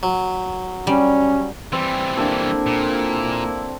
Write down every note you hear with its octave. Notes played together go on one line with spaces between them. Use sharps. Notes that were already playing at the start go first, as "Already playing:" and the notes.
F#3
G3 C#4
E3 G3 C4 G#5
A#3 D4 E4 G4 A4
A#2